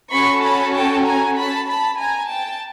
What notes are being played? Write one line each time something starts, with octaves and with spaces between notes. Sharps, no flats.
C#4 F#4 A4 B5 C#6
A5 B5
G5 A5
G#5 A#5
A5 B5
A5 B5
G#5 A#5
G5 A5